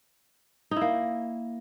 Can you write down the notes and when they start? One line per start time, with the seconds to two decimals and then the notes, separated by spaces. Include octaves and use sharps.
0.71 D#4
0.76 E4
0.81 A#3